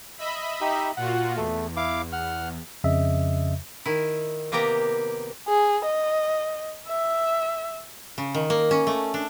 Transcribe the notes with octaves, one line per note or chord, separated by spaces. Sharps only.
D#5 E5 B5
D#4 G4
A#2 F4 F#4 F#5
E2 A3
E4 F5 D6
F#5 F6
F2 C#3 D#5 E5
D#3 E4
C3 A#3 B3 G4 G5 A#5
G#4
D#5
E5
C#3
D#3
A#3
C#4
A3
D4